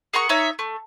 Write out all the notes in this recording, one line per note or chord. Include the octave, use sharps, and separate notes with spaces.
G#4 A#4 F#5 C#6
D#4 C#5 E5
A3